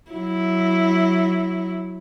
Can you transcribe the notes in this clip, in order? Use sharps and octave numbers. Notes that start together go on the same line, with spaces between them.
F#3 E4